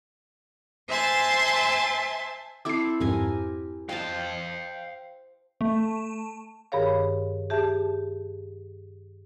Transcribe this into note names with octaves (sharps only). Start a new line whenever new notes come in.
C5 E5 G#5 A5 C6
C4 E4 A4 D6 C7
F2 G#2 G4 A#4 G#5
C5 D#5 F5 G5 A5
A3
G2 D#3 G#4 A#4 C#5 F5
G4 G#4 E5 A5